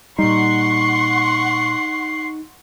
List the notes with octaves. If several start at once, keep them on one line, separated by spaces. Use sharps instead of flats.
A#2 G3 D#4 F#5 C6 C#6 C7